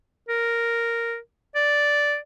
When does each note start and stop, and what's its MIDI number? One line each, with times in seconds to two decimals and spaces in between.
0.29 1.18 70
1.55 2.17 74